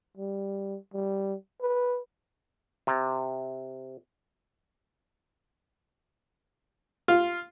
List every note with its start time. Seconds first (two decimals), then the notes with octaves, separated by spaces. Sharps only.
0.17 G3
0.94 G3
1.61 B4
2.87 C3
7.08 F4